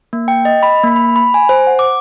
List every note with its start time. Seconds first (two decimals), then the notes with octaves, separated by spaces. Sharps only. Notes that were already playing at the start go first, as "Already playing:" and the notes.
0.13 A#3
0.28 G5
0.45 D#5
0.63 B5
0.83 A#3
0.96 B5
1.16 B5
1.34 G#5
1.49 C5
1.67 F#5
1.79 D6